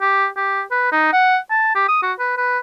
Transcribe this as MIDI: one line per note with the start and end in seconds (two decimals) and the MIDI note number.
0.01 0.27 67
0.36 0.62 67
0.71 0.87 71
0.92 1.08 63
1.13 1.38 78
1.50 1.75 81
1.75 1.84 67
1.88 1.99 87
2.03 2.13 66
2.19 2.36 71
2.37 2.58 71